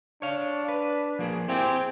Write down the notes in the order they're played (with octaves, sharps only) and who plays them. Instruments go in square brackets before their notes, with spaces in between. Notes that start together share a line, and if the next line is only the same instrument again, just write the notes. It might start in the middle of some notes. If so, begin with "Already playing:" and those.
[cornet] D4 [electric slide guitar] C#5 F5
[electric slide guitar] B4
F3 A#3 G#4
[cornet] C4 [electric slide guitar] E4 G4 G#4